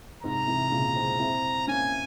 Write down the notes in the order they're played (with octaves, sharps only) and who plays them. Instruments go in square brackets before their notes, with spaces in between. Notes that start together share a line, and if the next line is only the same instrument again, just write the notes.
[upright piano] G#2 C3 [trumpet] A#5
[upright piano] C3 E3
A#2 C#3
G#3 C4
C4 E4
[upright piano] A#3 C#4 [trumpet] G#5